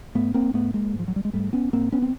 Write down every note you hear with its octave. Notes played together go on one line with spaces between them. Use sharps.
G#2 A3 B3
A#3 C4
G#2 A3 B3
G#3 A#3
G#2
F3
F#3
G3
G#3
G#2 G3 A3
B3 C#4
G#2 A#3 C4
B3 C#4
C4